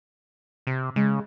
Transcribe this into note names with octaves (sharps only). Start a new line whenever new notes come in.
C3
C#3 G#3